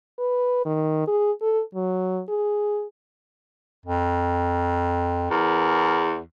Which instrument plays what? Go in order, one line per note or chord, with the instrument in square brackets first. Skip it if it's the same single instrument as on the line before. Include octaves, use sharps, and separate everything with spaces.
[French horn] B4
D#3
G#4
A4
F#3
G#4
[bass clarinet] F2
[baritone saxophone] E2 [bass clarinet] A#4